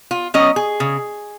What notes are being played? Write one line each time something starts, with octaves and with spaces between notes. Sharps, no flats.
F4
F#3 C#4 D#5
G#4
C#3